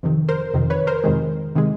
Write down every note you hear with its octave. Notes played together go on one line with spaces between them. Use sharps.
F2 C3 D#3
A#4 C5
F2 C3 D#3
B4 C#5
A#4 C5
F2 C3 D#3 G#3
C3 D#3 G#3